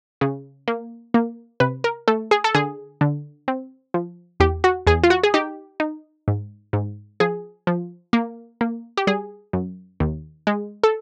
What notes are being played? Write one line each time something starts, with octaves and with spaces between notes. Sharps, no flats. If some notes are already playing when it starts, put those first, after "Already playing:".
C#3
A#3
A#3
C3 B4
A#4
A3 A4
G#4
A4
D3 G#4
D3
C4
F3
E2 G4
F#4
E2 G#4
F4
F#4
G#4
D#4 G4
D#4
G#2
G#2
F3 G#4
F3
A#3
A#3
G4
G3 G#4
F#2
D#2
G#3
A4